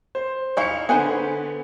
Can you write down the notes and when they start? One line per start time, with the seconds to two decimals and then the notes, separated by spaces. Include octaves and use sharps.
0.15 C5
0.57 D#4 E4 F5 C#6 C#7
0.89 D3 B3 G#4 B4 C5